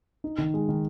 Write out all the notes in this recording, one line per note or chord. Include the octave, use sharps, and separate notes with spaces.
D#4
D#3
G#3
D#3